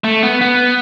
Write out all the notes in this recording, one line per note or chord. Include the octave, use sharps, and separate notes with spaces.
A3
B3
B3